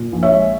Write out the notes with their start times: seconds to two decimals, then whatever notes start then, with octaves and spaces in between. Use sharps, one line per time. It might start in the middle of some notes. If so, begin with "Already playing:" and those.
Already playing: A#2
0.12 A#1
0.23 C#5 E5
0.32 G#3